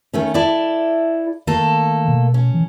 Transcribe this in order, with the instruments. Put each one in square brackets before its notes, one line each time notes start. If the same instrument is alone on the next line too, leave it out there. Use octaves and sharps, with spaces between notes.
[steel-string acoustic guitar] D#3 A3 C#4
E4 A4 D5
[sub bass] D#3 [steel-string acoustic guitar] A3 A#3 A4
[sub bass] B2
[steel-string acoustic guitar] C#4
[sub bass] E3